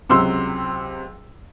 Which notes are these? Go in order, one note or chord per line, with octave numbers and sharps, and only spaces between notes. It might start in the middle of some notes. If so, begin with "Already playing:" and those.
C#2 C3 F#3 C6 E6